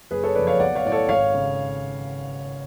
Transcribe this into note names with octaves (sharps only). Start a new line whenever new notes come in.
F#1 G#4 B4
A4 C#5
F2 C#3 B4 D5
C#5 F5
B1 D5 F#5
C#5 F5
A2 D5
A4 C#5
G#1 C#5 F5
C#3